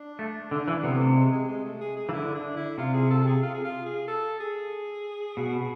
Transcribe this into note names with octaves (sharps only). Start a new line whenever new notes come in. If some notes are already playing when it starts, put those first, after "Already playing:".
Already playing: D4
A3
D3
E3
C3 B3
A3
G#3
G#3
G#3
A3
G#4
G#4
E3
D3 E4
D4
E4
C3 F4
G#4
A4
G#4
F4
G#4
F4
G#4
A4
G#4
B2